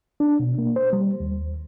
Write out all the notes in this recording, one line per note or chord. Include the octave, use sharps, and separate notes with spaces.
D4
B2
A#3
C5
G3
D#2